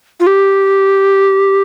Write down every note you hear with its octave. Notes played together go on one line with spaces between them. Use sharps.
F4
G4